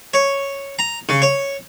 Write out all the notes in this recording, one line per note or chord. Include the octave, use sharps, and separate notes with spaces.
C#5
A#5
C#3
C#5